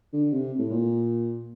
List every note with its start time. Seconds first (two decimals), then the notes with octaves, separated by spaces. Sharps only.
0.13 D3
0.33 C3
0.59 A2
0.71 A#2